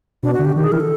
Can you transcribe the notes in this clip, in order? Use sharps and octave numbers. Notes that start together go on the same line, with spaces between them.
B2 D4
F#4
D3
G4
D#3 G4
G#4
E3 A#4
A4